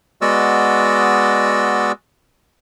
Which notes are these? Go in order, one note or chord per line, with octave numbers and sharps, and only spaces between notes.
G#3 B3 F#4 D5 D#5 E6